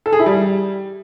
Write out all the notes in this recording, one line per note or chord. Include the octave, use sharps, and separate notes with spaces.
A4
G#4
E4
G3